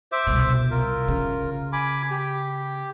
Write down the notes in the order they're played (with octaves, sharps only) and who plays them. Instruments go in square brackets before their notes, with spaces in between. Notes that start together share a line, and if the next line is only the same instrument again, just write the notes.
[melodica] C5 E5 D6
[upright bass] C2 B2
[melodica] F4 A#4
[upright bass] C#3
[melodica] G#5 B5 D6
G4